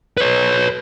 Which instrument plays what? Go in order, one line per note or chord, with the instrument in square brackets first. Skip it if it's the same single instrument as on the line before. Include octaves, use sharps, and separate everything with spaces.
[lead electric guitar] B4 C#5